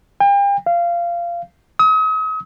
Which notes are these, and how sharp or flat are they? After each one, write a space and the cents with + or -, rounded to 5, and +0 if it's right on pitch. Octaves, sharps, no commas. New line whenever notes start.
G5 +40
F5 -20
D#6 +40